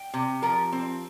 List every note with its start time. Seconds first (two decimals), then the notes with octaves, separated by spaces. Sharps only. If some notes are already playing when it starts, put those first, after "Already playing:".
Already playing: G5
0.14 C3
0.42 F3 A#4
0.72 C4